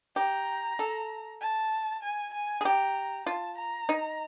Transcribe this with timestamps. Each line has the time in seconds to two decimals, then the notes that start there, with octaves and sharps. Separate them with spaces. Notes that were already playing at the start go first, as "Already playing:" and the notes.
0.16 G4 A#5
0.79 A4
1.41 A5
2.03 G#5
2.34 G#5
2.61 G#4
2.65 G4 A#5
3.26 F4 A5
3.58 A#5
3.89 D#4